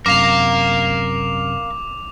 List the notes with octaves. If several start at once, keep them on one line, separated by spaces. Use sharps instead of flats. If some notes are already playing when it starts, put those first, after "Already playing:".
F#2 C3 A#4 F5 D6 F7